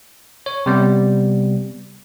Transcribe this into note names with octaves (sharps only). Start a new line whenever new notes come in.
C#5
C3 G3 B3